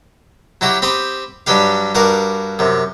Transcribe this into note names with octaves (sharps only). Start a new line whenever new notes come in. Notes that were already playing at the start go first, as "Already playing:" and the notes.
F#3 E4 F#4 G4
C4 G4 B5 D#6
G2 F#3 G3 G4 F5
G2 F#4 A#4 F5 D6
F#2 C3